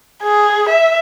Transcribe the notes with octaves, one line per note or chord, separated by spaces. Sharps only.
G#4
E5